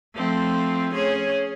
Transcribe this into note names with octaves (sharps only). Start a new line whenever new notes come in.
F3 A3 C4
C#4 G#4 C#5